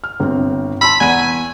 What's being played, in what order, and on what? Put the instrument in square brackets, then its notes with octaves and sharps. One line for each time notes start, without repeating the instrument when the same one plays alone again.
[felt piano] F6
G1 C4
[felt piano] A5 C6 E6 [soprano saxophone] B5
[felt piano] E2 F#5 D#7 [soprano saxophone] G#5